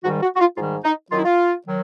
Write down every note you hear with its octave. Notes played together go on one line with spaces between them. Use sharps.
G#2 D#3 G3 F#4
F#4
F#4
F4
G#2 D#3 G3 F4
D#4
F#2 D#3 F#3 F4
E4
F4
D#3 F#3